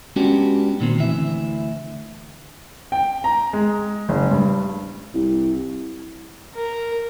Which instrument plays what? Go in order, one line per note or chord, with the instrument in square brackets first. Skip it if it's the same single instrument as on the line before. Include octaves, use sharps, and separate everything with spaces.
[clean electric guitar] G#3 B3 C#4 D4 F#4 G4
A#2 D#3 C4
D2 E3 E5
[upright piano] G5
A#5
G#3
F#1
G2
[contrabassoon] C2
[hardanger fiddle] A#4